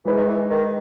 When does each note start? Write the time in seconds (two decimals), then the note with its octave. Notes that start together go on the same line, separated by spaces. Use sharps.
0.05 E3 G#3 D#4 G#4 B4
0.17 D#3
0.28 E3
0.50 D#3